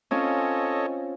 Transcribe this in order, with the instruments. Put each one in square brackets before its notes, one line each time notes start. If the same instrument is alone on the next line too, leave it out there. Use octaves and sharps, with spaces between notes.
[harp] C4 C#4 F4 [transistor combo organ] A4 C#5 D#5